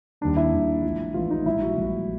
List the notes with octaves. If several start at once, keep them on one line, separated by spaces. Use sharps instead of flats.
D#2 D#3 G3 A#3 D4
E4
D#2 D#3 G3 A#3
A1 G#2 F3
A1 G#2 F3 F4
D#4
A#1 G#2 E3 G3 E4
F#4
A#1 G#2 E3 G3